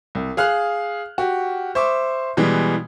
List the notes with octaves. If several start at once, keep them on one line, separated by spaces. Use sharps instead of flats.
C2
G#4 F5 F6 F#6
F#4 G4
C5 E5 C#6 D6
B2 E3 G3 G#3